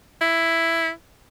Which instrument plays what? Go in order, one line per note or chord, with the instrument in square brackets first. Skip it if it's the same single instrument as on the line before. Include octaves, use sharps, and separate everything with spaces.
[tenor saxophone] E4